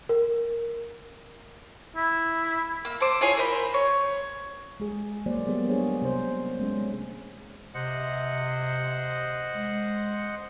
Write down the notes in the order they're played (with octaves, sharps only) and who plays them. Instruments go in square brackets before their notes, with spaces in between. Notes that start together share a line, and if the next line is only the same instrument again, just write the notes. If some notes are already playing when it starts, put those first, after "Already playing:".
[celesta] A#4
[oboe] E4
[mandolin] A#3
A4 C5 D6
E4 F4 G#4 C#5
A#4 C5 E5 B5
C#5
[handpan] G#3 G#4
F#3 A#3 C5 D5
G3 A#3 B3 G4 G#4
D4 G4 G#4 C5 C#5
C3 C5
G#3 A3 C#4
[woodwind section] C3 [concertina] C5 D#5 F#5
[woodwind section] G#3